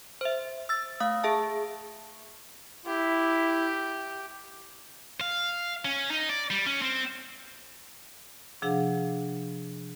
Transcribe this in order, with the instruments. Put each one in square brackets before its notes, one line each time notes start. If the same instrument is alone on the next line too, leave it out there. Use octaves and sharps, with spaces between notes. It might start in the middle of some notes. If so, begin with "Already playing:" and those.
[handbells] C5 E5
E6 A6
A3 F5 D#6
G#4 E5 A5
[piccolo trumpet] E4 [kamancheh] G4
[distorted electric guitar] F5
C#4
D#4
D5
G3
C#4
C4
[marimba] C3 F3 D4 G#4 F5 F#5